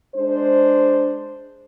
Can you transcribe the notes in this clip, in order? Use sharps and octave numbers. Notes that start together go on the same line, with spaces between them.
G#3 D4 C5